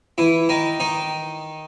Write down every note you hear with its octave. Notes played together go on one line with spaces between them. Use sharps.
E3 E4
D#3 D#4
D#3 D#4